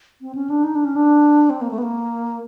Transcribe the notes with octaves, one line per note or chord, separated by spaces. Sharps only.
C4
C#4
D4
D#4
D4
C#4
D4
C4
A#3
A3
B3
A#3